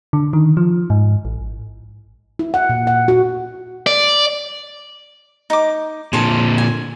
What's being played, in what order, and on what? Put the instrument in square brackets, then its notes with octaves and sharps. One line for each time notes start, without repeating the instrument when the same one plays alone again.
[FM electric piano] D3
D#3
F3
G#2
A1
[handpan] E4
F#5
A#2
F#5
F#4
[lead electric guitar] D5
[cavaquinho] D#4 D6
[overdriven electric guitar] A#2 D3 [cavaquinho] G#4 C5 A5
[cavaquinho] G#5